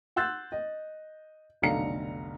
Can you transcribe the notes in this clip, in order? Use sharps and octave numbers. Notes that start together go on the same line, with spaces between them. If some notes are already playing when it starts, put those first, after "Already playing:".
F#5 C6 E6 F#6 G6 A6
D#5
F1 B1 D3 F5 A#5 C#7